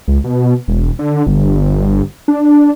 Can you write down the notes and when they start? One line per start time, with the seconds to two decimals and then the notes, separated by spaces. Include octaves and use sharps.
0.08 C#2
0.24 B2
0.68 E1
0.99 D3
1.27 G1
2.28 D4